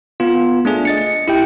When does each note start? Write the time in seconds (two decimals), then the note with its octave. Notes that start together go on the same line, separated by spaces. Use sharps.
0.20 B3 F4
0.65 A3 D4 G#4
0.85 D#5 A6 C#7
1.28 E4 G4 G5